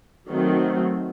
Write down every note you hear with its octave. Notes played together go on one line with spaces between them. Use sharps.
D#3 F#3 A3 C4